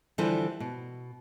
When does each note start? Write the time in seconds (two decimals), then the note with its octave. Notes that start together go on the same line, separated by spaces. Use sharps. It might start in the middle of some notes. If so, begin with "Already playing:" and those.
0.18 D3 E3 F3 G3 B4 C5
0.60 B2